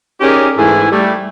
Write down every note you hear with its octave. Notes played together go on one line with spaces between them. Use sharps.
C#4 D#4 G4 G#4 A#4 D5
G#2 E3 A3 E4 G#4 G#5
G3 A3